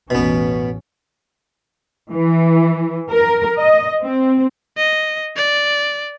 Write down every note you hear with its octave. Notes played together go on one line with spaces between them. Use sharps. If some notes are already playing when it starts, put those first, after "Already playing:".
A1 E2 B2 B3 C#4
E3
A#4
D#5
C4
D#5
D5